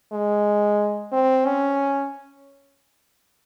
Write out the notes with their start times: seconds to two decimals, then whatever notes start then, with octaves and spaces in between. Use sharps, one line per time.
0.12 G#3
1.12 C4
1.46 C#4